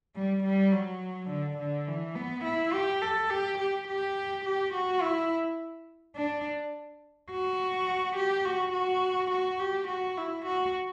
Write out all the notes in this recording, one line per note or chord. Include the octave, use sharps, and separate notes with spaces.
G3
G3
F#3
D3
D3
E3
B3
E4
G4
A4
G4
G4
G4
G4
F#4
E4
D4
F#4
G4
F#4
F#4
F#4
G4
F#4
E4
F#4